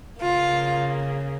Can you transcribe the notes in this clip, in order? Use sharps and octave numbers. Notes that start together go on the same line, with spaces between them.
C#3 A#3 F4